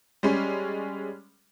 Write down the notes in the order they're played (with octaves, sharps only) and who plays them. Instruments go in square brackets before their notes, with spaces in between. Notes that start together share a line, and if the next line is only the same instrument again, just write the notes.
[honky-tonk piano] G3 G#3 C#4